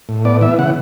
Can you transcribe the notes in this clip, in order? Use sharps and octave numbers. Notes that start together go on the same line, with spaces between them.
A2
B3 D5
E3 E5
C#3 F#5